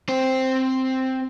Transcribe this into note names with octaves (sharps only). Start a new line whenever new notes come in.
C4 C5